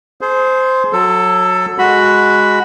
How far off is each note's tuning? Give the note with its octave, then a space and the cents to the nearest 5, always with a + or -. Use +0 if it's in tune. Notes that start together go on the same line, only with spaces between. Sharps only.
G#4 +35 C5 -10
F#3 -15 A4 +10
G#3 +0 F#4 +0 B5 +0